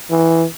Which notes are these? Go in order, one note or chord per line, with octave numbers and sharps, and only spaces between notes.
E3